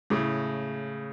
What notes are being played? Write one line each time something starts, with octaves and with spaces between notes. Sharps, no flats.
A2 C#3